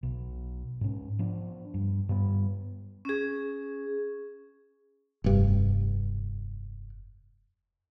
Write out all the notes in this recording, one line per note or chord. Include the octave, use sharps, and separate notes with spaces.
B1
G#2 C#4
F3 B3 D4
G2
G2 G3 B3
C#4 G#4
F1 G2